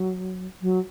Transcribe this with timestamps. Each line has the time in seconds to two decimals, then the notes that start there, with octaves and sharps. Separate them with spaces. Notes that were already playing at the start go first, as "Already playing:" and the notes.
Already playing: F#3
0.62 F#3